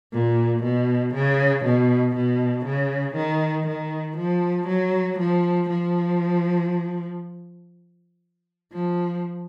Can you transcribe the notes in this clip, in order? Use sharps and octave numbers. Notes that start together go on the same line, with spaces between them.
A#2
B2
C#3
B2
B2
C#3
D#3
D#3
F3
F#3
F3
F3
F3